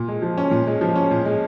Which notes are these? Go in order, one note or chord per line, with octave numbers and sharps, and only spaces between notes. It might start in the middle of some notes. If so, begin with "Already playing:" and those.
Already playing: A#2
G#3
F3
C#4
A#2
G#3
F3
C#4
A#2
G#3